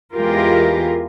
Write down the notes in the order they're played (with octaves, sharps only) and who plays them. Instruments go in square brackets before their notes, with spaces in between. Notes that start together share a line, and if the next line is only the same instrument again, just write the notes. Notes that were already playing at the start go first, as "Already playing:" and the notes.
[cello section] E2 E3 G#3 F4 G4 A#4